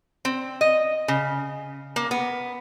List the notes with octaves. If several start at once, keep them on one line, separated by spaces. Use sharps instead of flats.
C4
D#5
C#3
A#3
B3